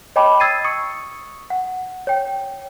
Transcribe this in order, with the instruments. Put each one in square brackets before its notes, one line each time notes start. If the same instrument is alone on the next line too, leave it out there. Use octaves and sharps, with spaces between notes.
[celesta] C#5 D#5 G5 A5 B5 D6
D#6 E6 G#6 A6 C7 D#7
C#6 D#6 C#7
F#5
C#5 G5